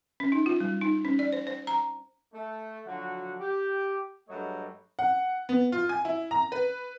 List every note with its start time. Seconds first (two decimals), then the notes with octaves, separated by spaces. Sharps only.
0.20 C#4
0.32 D#4
0.46 F4
0.60 G3
0.81 D#4
1.05 C#4
1.19 D5
1.33 C5
1.47 C5
1.67 A#5
2.33 A3
2.86 D3 F3 F#3 F#4
3.40 G4
4.29 G2 F#3 G#3 A3 C#5 D#5
4.99 F#5
5.49 B3
5.72 F4
5.89 G#5
6.05 E4
6.31 A#5
6.52 B4